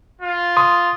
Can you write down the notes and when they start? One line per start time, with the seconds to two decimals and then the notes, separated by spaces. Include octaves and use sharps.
0.22 F4
0.57 C6 D#6